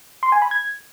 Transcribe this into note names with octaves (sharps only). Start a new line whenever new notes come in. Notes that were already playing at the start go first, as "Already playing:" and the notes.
C6
G#5
B5
G#6